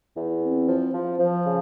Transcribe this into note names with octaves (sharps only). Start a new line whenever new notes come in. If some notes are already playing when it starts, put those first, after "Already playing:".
E2
C4
F3
F3
F3
C#3